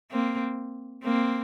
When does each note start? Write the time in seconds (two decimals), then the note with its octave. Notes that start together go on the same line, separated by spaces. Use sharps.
0.11 A#3 C4
1.04 A#3 C4